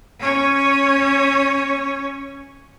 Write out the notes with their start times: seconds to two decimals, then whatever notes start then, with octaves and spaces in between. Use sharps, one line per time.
0.20 C#4 C#5